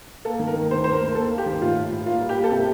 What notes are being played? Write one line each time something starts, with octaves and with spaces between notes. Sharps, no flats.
A#3 A4
D#3
A#4
D#3
D2 C5
C4 C5
A#4
D2
D#2 A4
A#3
G4
D#3
A2 F4
A2
A2
A#3 F4
G3
G4
A#3
A4
C3 G4